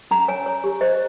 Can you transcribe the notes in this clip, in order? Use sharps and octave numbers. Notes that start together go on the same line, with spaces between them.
C#4 A#5
C#5 G#5
C#5
G4
C5 D#5